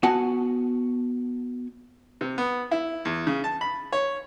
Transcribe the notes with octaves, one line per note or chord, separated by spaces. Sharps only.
B3 F#4 F#5 G#5 A5
C3
B3
E4
E2
C#3
A5
B5
C#5